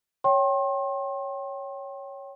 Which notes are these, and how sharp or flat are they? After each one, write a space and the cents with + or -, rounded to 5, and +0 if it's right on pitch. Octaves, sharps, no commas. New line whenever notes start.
C#5 +0 G5 -15 C6 +40